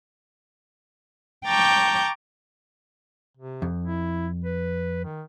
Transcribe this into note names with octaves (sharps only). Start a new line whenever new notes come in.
G5 A5 A#5 C#6 D6 G6
C3
F2
E4
B4
D#3